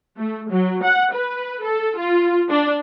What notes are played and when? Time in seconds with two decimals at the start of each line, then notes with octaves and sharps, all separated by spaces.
0.17 A3
0.51 F#3
0.84 F#5
1.14 B4
1.64 A4
1.97 F4
2.50 D4